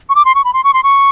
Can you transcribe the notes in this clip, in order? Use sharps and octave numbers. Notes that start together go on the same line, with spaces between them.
C#6
D6
C6
C#6
B5
C6
C#6
C6
C#6